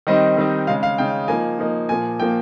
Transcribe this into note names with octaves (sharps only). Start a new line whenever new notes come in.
D#3 G3 C4 D#4 D#5
D#3 G3 C4 D#4
C#3 G#3 D#4 F5
F5
C#3 G#3 D#4 G5
F3 A#3 D#4 G#5
F3 A#3 D#4
A#2 F3 A#3 G#5
A#2 F3 A#3 G5